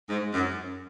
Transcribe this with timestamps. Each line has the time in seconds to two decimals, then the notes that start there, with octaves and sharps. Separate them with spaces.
0.09 G#2
0.34 F#2